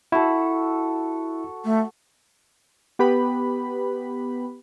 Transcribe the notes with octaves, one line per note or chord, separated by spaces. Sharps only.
E4 F#4 A4
A3
B3 G4 B4 B5